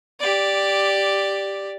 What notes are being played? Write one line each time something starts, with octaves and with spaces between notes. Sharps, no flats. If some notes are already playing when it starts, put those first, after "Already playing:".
G4 D5